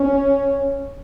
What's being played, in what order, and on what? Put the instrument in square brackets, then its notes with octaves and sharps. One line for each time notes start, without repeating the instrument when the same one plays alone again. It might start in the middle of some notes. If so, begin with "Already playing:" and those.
Already playing: [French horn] C#4